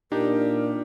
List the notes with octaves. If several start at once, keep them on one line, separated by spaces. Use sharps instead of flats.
A#2 D4 D#4 G4 A#4